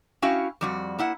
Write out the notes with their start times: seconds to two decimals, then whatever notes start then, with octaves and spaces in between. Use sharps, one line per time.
0.22 C#4 E4 F#4 F5 G5
0.61 F2 G3 F#4
0.98 A#3 E4 F#5